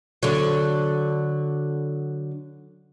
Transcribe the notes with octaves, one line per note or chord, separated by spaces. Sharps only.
D3 F#3